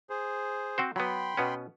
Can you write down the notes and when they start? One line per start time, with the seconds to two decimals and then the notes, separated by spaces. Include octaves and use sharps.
0.10 G#4 C5
0.78 C4 F#4 C5
0.96 F#3 B3 G5 B5 C6
1.37 B2 B3 C#4